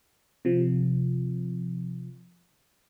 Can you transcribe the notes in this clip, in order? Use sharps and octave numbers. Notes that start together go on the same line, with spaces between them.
C3 F3